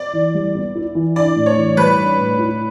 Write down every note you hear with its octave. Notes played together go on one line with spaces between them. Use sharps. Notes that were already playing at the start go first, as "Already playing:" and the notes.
Already playing: D5
E3
G3
B3
E4
E3
D4 D5
A2
C#5
E3
G3 B4
D4
A2
E4